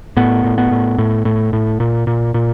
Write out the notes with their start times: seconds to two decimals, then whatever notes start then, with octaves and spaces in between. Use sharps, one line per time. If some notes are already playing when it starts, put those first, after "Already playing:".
0.17 A2 B3
0.44 A2
0.58 B3
0.71 A2
0.98 A2
1.25 A2
1.53 A2
1.80 A#2
2.07 A#2
2.34 A#2